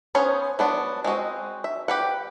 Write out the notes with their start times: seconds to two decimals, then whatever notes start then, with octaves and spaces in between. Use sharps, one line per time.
0.15 B3 C#4 G#4 C5 C#5
0.59 F#3 B3 D4
1.04 G#3 C4 F#4 D#5
1.64 E5
1.88 G4 B4 F#5